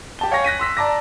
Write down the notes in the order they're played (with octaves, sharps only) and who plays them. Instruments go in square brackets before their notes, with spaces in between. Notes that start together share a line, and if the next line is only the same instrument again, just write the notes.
[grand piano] G4 A5 G7
C#5 F5 G5 G#5 C#6 A#6
F#6 A#6 B6 D#7
C6 E6 B6
D5 A5 A#5 D6 A#6